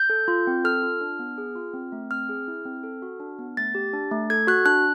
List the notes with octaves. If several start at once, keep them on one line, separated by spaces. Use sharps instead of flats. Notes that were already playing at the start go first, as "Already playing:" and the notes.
Already playing: G6
A4
F4
C4
A4 F6
F4
D4
B3
G#4
F4
C4
A3
C4 F6
G#4
E4
C4
A4
F#4
D4
B3
A3 A6
G4
D4
A3
A4 G#6
F#4 F#6
D4 F#6